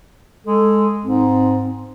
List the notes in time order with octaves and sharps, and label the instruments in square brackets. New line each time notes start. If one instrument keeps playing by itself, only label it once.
[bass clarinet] G#3 [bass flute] A4
[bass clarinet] G#2 [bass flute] C4